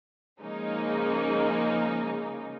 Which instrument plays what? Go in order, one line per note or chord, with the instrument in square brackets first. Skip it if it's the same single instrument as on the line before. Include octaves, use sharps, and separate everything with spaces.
[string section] C#3 F3 G#3 A#3 C#4 D#4